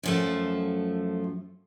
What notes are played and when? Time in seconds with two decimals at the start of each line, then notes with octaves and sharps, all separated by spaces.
0.03 F#2 F3 A3